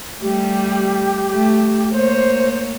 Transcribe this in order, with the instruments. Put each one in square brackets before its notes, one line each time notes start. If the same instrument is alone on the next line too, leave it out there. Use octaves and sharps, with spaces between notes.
[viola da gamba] G3 A3 [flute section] G4
[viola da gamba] A3
[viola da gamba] A#3 C#5 [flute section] C5